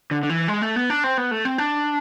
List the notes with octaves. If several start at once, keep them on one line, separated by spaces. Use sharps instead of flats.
D3
D3
E3
G#3
A3
B3
D4
C4
B3
A3
C4
D4